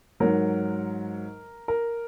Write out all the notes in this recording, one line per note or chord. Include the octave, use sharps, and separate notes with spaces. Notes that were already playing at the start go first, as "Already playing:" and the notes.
G#2 F#3 A#4
A#4